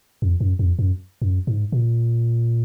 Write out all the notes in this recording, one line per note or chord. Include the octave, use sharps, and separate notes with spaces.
F2
F#2
F2
F#2
F#2
G#2
A#2